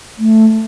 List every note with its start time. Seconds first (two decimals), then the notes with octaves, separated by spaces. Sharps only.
0.18 A3